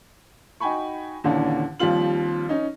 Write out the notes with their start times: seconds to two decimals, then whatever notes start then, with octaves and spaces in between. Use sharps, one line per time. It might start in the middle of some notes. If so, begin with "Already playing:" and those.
0.60 D#4 F#4 G5 G#5 B5 C#6
1.24 D#2 A#2 D3 E3 C#4 D4
1.80 D#2 F3 G3 C4 F4 F#7
2.49 C#4 D#4